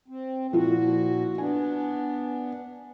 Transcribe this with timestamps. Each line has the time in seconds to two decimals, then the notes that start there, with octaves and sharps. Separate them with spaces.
0.08 C4
0.53 A#2 F3 E4 F#4
1.38 B3 D4 G#5